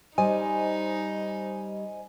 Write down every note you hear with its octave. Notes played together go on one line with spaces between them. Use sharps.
G3 D#4 C5 D#5 G#5